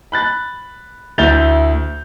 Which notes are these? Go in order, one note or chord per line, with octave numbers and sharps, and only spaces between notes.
B5 F#6 A6
D2 E4 G6 A6 F7 G7